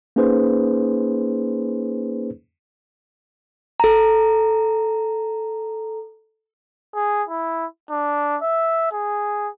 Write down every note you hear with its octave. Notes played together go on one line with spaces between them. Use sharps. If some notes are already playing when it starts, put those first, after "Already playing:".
A#3 C#4 D#4 G#4 B4 C5
A4 A#5
G#4
E4
D4
E5
G#4